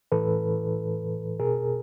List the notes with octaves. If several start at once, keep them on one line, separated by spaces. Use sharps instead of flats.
A2 E3 A4 B4
B2 G#4 A#4